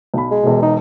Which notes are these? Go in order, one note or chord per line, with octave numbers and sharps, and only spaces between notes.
B1 B5
G#3
E1 B2
D#4